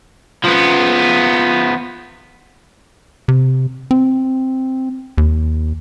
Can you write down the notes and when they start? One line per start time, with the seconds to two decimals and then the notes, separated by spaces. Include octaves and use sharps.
0.45 F3 B3
3.28 C3
3.91 C4
5.18 D#2